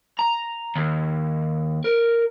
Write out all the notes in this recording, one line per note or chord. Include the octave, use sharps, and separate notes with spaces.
A#5
D#2
A#4